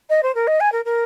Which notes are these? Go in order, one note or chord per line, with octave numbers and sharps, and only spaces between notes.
D#5
C5
A#4
D#5
G#5
A#4
A#4